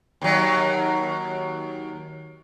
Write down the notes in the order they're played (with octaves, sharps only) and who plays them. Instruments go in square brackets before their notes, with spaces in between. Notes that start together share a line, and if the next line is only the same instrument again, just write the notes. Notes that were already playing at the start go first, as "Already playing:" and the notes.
[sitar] D#2 F#3